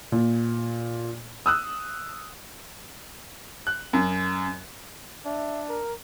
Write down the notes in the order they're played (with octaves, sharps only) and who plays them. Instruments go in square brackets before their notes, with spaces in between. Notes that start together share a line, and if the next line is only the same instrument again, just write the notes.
[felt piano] A#2
D#6 E6 F#6
[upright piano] F#6
F#2
[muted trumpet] D4 [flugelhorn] E5
[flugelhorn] A#4